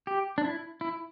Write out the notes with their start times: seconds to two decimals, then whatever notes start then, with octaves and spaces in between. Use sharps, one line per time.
0.07 G4
0.38 D4
0.44 E4
0.81 E4